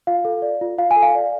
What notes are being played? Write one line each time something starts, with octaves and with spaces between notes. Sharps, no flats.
F4 F5
A4
D5
F4
F4 F5
G#5
A4
F5
D5